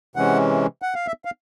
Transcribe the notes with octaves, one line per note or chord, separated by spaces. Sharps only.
C3 E3 G#3 C#4 F#5
F#5
F5
E5
F5